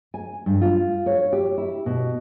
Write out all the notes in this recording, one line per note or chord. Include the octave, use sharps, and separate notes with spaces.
G#5
G2
F4
C#5
G4
E4
B2